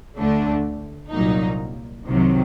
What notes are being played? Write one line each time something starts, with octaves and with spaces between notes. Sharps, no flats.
D2 D3 A3 D4
C2 A#2 F#3 A#3 D#4
C2 C3 D#3 F#3